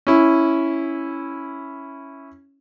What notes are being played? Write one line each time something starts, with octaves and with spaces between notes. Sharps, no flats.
C#4 E4